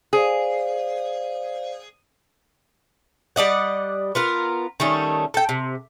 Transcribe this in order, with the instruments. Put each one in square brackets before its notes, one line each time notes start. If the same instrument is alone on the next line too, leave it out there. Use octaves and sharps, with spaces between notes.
[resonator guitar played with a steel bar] G#4 [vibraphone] C5 D5 F5
[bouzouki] G3 D5 D#5 F#5
B3 F4 A#4
D#3 G3 A3 C#4
A4 G5
C3